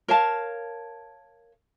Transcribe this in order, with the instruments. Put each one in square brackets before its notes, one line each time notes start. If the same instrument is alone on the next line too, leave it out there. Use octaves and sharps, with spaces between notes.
[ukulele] A#4 C#5 F5 A5